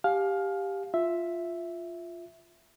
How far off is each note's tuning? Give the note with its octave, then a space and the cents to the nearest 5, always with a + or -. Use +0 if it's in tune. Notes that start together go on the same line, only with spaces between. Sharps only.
G4 +5 F5 +15 G#5 +40
F4 +0 E5 +0